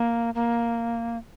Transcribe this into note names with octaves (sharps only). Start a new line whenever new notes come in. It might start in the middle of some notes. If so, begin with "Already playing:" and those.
Already playing: A#3
A#3